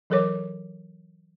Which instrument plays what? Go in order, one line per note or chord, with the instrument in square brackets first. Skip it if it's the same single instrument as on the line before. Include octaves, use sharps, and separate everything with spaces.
[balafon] E3 F#3 A4 A#4 C#5 D6